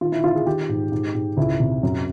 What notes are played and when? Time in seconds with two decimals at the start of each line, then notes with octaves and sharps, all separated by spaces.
0.01 D#3 F4
0.12 E4
0.23 D#3 F4
0.35 G#4
0.46 D#3 G4
0.69 G#2
0.92 G#2
1.15 G#2
1.37 C#2 E4
1.60 C3
1.83 F#2